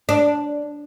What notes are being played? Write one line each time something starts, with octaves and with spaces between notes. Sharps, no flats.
D4